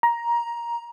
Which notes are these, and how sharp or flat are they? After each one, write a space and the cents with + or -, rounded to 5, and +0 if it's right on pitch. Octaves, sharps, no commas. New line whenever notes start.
A#5 +15